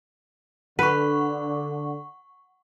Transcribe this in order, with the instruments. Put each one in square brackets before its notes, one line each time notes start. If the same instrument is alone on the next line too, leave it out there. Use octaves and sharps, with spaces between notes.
[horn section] D3 [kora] B4 [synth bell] F#5 C#6